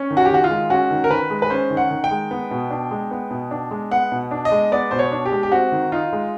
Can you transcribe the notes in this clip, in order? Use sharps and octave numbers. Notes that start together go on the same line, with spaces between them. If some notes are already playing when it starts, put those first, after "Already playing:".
Already playing: C#4
D#3
F#4
G4
D#3 F#4
F4
G#3
C#4 F#4
D#3
A#4
D#3 B4
G#3
B4
C#4 C5
D#3
F#5
D#3
G5
G#3
B3
B2
D4
G#3
B3
B2
D4
G#3
B3 F#5
B2
D4
D#5
G#3
B3 D5
B2 C5
C#5
D4
G4
G#3
G4
C4 F#4
D#3
D#4 F4
G#3